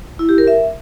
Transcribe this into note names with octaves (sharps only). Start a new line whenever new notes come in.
E4
G4
A#4
E5